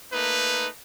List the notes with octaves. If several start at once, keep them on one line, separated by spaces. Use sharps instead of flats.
A3 A#3 D#4 B4